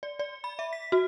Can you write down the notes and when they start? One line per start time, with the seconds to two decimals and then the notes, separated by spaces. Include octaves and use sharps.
0.03 D5
0.19 D5
0.44 B5
0.59 E5
0.73 B6
0.92 F#4